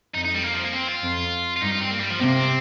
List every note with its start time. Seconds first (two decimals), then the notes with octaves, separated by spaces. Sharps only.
0.14 F2 D#4
0.25 D#4
0.34 G3
0.44 A#3
0.53 F3
0.64 A#3
0.73 C4
0.88 F4
1.02 F2
1.56 F4
1.61 G2 D#4
1.71 F4
1.81 C4
1.91 A#3
2.00 G3
2.10 F3
2.19 C3 A#3
2.34 C4